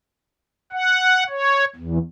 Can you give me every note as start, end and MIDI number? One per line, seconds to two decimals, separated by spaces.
0.73 1.24 78
1.29 1.65 73
1.76 1.98 40